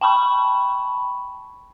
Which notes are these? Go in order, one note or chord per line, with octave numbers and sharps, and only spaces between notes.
G5 A5 B5 C#6